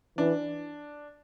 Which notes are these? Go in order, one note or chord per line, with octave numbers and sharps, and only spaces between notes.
E3 D4